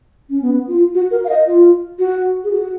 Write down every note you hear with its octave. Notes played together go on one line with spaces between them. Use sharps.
C#4
B3
F4
F#4
A#4
F5
D#5
F4
F#4
G#4
F#4